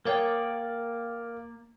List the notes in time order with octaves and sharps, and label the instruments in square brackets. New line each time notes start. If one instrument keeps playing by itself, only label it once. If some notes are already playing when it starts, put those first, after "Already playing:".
[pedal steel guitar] A#3 D5 [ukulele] G#4 C#5 G5 [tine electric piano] A#4 F5